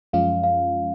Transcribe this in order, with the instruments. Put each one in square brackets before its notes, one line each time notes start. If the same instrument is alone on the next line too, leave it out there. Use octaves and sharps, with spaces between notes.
[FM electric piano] F#2 F3 G#3 C#4 F4 [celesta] F5
[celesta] F5